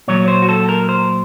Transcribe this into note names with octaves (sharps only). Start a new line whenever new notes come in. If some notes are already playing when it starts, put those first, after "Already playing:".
A#2 F#3 C#5
C5
F#4
A4
A#4
C5